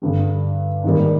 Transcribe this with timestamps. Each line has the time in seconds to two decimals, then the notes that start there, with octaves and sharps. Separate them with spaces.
0.02 G2 D3 G3
0.84 G#2 D#3 G3 A#3